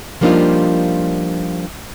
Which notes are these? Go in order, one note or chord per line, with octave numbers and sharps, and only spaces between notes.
F3 G3 A#3 D4 D#4 F4